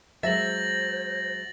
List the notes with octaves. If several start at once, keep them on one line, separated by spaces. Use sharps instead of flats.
F#3 G#3 C5 E5 A6 A#6 F#7